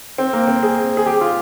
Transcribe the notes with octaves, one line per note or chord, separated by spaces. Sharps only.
C4
A#3
C4
G#4
G#4
G4
F4